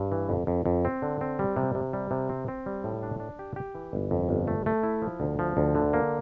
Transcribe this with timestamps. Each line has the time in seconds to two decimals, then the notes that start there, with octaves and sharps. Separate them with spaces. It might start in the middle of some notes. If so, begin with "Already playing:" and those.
Already playing: G2
0.12 E3
0.29 F2
0.47 F2
0.66 F2
0.85 C4
1.02 D3
1.21 C4
1.39 G3
1.56 C3
1.75 C3
1.93 G3
2.11 C3
2.29 C4
2.48 C4
2.66 G3
2.84 A2
3.03 D4
3.20 D4
3.39 G4
3.56 G4
3.75 E3
3.93 G1
4.11 F2
4.29 G1
4.48 A3
4.66 A3
4.83 E4
5.02 F3
5.20 D2
5.39 F3
5.57 D2
5.75 D3
5.93 A#3